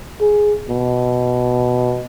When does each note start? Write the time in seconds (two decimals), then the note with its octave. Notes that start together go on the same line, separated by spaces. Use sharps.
0.21 G#4
0.69 B2